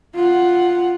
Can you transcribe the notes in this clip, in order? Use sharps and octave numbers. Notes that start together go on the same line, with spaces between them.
F4 F#5